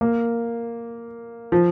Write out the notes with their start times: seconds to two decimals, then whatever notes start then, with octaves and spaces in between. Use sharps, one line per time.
0.01 A#3
1.52 F3